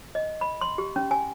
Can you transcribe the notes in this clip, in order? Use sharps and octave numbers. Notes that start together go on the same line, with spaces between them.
D#5
B5
C6
G4
C#4
G#5